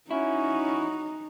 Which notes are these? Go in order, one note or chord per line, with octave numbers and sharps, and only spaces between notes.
C#4 D#4 E4 F#4